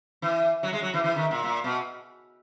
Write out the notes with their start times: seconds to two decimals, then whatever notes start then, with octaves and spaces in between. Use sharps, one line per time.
0.22 E3
0.63 F#3
0.73 G#3
0.82 F#3
0.94 E3
1.04 E3
1.16 D#3
1.31 A#2
1.44 A#2
1.64 B2